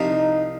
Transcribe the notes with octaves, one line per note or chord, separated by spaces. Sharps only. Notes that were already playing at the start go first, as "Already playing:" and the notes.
Already playing: C2 C3 F3 D#4